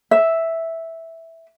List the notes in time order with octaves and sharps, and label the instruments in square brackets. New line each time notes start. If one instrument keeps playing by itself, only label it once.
[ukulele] E5